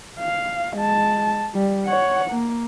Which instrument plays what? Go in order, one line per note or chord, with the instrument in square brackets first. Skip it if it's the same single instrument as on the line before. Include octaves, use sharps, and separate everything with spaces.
[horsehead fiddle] F5
G#3 A5
G3
C#5 F#5
A#3